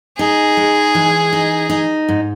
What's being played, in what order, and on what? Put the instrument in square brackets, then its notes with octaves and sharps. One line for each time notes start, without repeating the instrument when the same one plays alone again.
[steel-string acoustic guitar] D#4 [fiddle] G#4
[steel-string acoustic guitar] G#3
E3
D#4
D#4
G#2